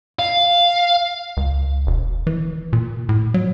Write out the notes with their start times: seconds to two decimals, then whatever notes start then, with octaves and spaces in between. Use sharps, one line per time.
0.19 F5
1.37 C#2
1.87 E1
2.27 E3
2.73 A#2
3.09 A2
3.34 F#3